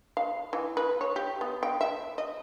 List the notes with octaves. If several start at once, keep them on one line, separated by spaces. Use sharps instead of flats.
F5
E3
B4
C#5
G4
B3
G5
E5
D#5